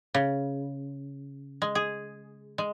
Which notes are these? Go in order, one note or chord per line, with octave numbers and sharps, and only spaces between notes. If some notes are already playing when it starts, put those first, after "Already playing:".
C#3
G#3
G#4
G#3